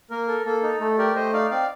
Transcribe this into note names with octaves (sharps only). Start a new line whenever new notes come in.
A#3 A#4
A4
A#3 A4
D#4
A3 A4
G4 A#4 D5
A3 C5 D#5
D#4 D5 F5
C4 D5 F5